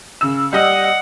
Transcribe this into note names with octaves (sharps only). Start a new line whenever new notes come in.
C#3 E6
G3 D#5 F#5 D#6